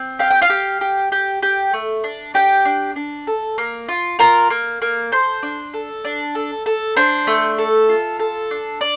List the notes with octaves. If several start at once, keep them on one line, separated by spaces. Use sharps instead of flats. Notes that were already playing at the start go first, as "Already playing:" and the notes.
Already playing: C4
G4 F5
G5
F4 F5
G4
G4
G4
G4
A3
D4
D4 G4 G5
D4
D4
A4
A#3
F4
F4 A#4 A#5
A#3
A#3
A4 C5 C6
D4
A4
D4
A4
A4
D4 C5 C6
A3
A4
F4
A4
D4
D5